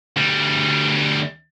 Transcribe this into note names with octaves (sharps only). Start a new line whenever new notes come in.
D2 G3